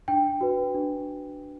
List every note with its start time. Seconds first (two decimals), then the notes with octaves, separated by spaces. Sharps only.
0.08 D4 G5
0.41 F#4 B4
0.74 D4